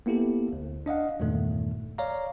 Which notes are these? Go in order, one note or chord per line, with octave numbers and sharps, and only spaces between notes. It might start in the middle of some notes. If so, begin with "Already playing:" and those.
A#3 B3 E4 G4 A4
D2
D4 D#5 F5 F#5
E2 G2 A#2 D#3 A3
C#5 D5 F5 A#5